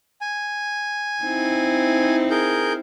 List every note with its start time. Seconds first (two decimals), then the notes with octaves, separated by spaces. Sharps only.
0.21 G#5
1.23 C4 D#4 E4
2.30 G#4 A#4 G6